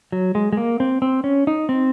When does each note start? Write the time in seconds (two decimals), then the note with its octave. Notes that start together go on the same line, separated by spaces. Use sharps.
0.12 F#3
0.35 G#3
0.53 G#3
0.57 A#3
0.80 C4
1.02 C4
1.24 C#4
1.47 D#4
1.69 C4